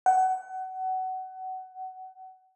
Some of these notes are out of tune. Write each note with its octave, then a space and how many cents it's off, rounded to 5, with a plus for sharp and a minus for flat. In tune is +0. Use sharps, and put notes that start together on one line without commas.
F#5 +25